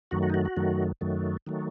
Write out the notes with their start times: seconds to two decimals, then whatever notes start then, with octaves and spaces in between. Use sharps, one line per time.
0.11 F#2 D#3 F#3 A3 F#4
0.23 F#4
0.30 D#4
0.34 F#4
0.45 F#4
0.57 F#2 D#3 F#3 A3
1.01 F#2 D#3 F#3 A3
1.47 D#3 F#3 A3